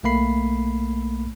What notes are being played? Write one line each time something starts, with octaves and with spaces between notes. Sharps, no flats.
B1 A3 A#3 B5 C7